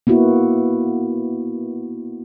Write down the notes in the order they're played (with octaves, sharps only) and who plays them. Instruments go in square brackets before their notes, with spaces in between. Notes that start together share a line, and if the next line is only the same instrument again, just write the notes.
[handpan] A#3 B3 E4 F#4